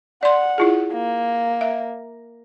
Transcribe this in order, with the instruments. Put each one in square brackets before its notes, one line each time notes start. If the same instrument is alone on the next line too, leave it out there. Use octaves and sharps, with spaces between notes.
[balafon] D5 C6 [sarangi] F#5
[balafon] E4 F4 G#4
[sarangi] A#3
[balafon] E5